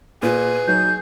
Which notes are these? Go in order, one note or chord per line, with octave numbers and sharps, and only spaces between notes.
A#2 G#4 B4
F#3 D#4 G6